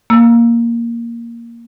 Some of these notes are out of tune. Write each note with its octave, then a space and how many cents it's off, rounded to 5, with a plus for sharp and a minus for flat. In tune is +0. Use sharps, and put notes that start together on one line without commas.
A#3 +0 E6 +10